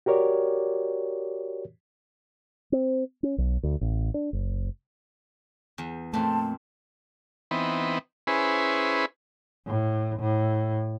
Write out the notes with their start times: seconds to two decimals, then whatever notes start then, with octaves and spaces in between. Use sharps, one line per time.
0.06 F#4 G4 A#4 C#5 D5
2.72 C4
3.23 C#4
3.38 B1
3.63 D2
3.81 A1
4.14 D4
4.33 F#1
5.78 E2
6.14 F2 A#2 A3 C4 A5
7.51 E3 B3 C4 D#4
8.27 C#4 E4 G#4 B4 C5
9.67 A2
10.20 A2